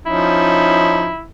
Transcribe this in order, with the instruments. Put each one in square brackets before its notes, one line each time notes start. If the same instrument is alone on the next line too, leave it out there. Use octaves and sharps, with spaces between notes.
[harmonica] F3 C#4 D#4 [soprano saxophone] E4